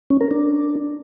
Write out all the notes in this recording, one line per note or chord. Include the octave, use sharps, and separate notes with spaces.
C#4
A#4
D4